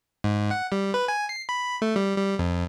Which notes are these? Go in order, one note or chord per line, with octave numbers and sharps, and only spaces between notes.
G#2
F#5
G3
B4
G#5
C7
B5
A3
G3
G3
F2